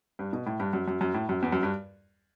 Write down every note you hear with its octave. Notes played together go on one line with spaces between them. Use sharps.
G2
B2
A2
G2
F#2
F#2
F#2
A2
F#2
E2
F#2
G2